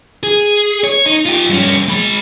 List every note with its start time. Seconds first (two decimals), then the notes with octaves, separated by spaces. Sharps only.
0.23 G#4
0.84 C#5
1.06 D#4
1.26 F4 G4
1.50 G2 C#4
1.88 G#3 B5